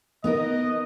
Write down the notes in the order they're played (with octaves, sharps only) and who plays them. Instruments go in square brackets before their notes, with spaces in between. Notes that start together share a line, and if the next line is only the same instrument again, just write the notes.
[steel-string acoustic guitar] B3 D#4 A#4 [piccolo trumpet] D#5